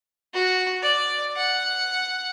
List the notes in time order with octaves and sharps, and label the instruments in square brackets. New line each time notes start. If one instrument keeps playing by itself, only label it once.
[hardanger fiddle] F#4
D5
F#5